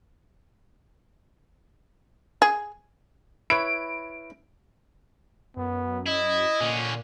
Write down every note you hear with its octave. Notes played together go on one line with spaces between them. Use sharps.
G#4
E4 B4 C#5 D7
F#2 B3
E4 D#5
A#2 D3 C#4